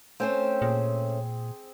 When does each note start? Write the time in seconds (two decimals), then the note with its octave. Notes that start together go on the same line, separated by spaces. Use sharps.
0.20 A3 C4 C#4 C5 G5
0.62 A#2 G#4